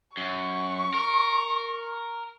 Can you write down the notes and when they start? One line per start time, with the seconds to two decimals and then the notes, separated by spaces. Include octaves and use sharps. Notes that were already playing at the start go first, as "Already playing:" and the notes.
0.17 F#2 C#6
0.94 A#4